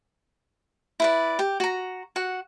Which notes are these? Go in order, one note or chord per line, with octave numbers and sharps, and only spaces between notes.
E4 B4 D5
G4
F#4 A#5
F#4 F#5